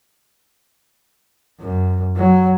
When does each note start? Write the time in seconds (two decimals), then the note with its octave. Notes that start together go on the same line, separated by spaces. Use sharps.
1.60 F#2
2.16 F#3